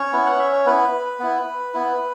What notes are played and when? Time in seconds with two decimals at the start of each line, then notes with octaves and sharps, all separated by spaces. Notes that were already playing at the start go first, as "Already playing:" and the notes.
Already playing: C#4 C#5
0.13 B3 E4
0.26 F#5
0.39 E5
0.53 C#5
0.66 B3 E4 B4
1.20 B3 E4
1.74 B3 E4